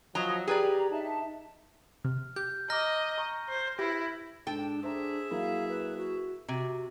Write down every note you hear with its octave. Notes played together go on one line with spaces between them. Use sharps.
F3 F#3 C#4 D#5 A#5 D#6
G4 G#4 B4 D5 A#5
D4 D#4 E5 A5
C3 F6
G4 G6
D#5 A#5 D6 F6 A#6
A#5 C#6
C5
E4 G4 B4 A#6
G#2 D4 A4 G5
D4 G#4 C5 E5 A#5
F#3 A#3 E4 F5
B4
F#4
C3 F#4 A#5